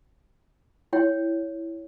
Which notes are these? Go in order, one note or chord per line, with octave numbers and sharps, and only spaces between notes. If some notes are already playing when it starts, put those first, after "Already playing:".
E4 C#5 G5